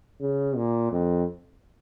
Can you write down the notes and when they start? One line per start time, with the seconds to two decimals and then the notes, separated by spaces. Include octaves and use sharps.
0.21 C#3
0.56 A#2
0.92 F2